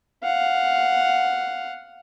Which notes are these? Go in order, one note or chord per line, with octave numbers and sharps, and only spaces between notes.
F5 F#5